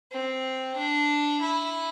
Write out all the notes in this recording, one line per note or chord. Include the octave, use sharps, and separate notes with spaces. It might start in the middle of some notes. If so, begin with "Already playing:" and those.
C4
D4
E4